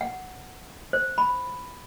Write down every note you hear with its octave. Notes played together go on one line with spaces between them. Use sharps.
F#5
C5
B5